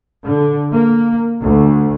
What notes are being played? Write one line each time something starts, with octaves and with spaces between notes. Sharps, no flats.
D3
A#3
D2